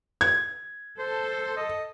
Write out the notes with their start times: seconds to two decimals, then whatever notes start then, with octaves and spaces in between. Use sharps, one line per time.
0.21 G#6
0.99 A4 C5
1.57 D#5